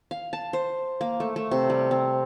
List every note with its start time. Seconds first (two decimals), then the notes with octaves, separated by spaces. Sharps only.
0.11 F5
0.33 A5
0.53 C5
1.01 A#3
1.20 A3
1.36 A3
1.51 C3
1.70 G3
1.91 C4